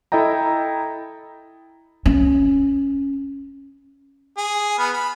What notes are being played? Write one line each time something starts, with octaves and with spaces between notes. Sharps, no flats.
E4 A4 D#5 G5 A#5
C#4
G#4
B3 B5 F6
B5